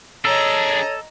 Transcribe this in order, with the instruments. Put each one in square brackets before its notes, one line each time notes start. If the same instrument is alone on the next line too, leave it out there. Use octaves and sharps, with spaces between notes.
[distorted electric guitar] D4 G#4 [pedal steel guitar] A4 [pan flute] C#5 [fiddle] D#5 A#5